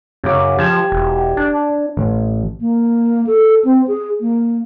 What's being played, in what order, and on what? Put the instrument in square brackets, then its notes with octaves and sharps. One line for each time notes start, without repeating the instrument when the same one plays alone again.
[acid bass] F#2 [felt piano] C#3 D6
[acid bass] F3 [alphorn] G4 [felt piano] G#6 E7
[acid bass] E1
D4
[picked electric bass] A1
[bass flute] A#3
A4
C4
G#4
A#3